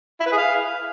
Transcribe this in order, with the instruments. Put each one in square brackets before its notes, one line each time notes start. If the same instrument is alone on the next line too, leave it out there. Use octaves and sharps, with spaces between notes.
[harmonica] E4
B4
G#4
F5